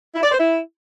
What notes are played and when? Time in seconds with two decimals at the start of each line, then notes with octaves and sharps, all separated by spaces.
0.15 E4
0.23 D5
0.31 C5
0.40 E4